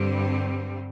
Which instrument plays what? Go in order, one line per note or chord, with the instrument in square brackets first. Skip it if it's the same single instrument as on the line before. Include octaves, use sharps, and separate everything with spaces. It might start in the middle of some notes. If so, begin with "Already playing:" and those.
Already playing: [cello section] G2 D3 G3 C4